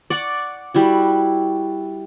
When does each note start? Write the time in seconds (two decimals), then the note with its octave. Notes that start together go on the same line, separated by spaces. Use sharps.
0.10 D5 F#5 C#6
0.74 G3 E4 F#4